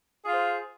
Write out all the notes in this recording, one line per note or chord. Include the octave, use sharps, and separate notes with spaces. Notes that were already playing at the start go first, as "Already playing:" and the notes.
F4 G#4 C5